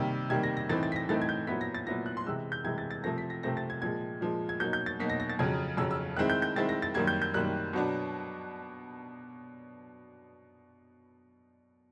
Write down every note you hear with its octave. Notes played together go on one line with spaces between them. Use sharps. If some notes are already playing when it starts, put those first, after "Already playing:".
Already playing: C3 D#3 G3 A#3
C3 D#3 G3 A#3 G#6
A#6
A#6
A2 E3 A3 C4 D#4 A6
A6
B6
A#6
A2 E3 A3 C4 D#4 A6
G#6
G6
A#2 F#3 B3 E4 B6
A#6
A6
A#2 F#3 B3 E4 A#6
F#6
C6
C3 E3 G#3 E6
G6
C3 E3 G#3 G#6
A6
A6
C3 F3 A3 C4 A#6
B6
A#6
C3 F3 A3 C4 A#6
A6
G#6
A#2 F3 G#3 G#6
A#2 F3 G#3
G#6
B2 F#3 A#3 D#4 G6
G6
A6
B2 F#3 A#3 D#4 B6
A#6
A#6
A6
F2 C#3 F#3 G#6
F2 C#3 F#3 E6
E6
D#3 G#3 C4 E4 F#6
G6
G6
D#3 G#3 C4 E4 A6
A#6
A6
F#2 D#3 G3 A#3 G#6
G6
G6
F#2 D#3 G3 A#3 F#6
B2 F#3 B3 D4